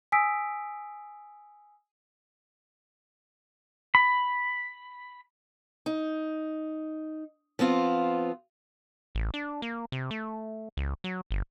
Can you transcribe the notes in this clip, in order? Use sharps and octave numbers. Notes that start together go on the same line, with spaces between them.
G#5 D#6 E6 B6 D7
B5
D#4
F3 B3 C4 F4
A1
D4
A#3
C3
A3
C#2
F#3
G1